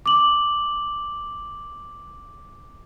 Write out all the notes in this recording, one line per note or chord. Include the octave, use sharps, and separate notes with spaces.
D6 F#7